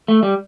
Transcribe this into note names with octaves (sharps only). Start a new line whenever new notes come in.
A3
G3